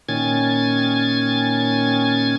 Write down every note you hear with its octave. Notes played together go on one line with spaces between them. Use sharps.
A#2 D#3 C#4 G#5 G#6 A6